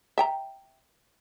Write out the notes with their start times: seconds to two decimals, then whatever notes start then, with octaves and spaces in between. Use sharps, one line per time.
0.18 E5 G5 A#5